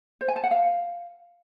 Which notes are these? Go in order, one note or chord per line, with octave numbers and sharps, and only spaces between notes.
C5
G#5
A5
F#5
F5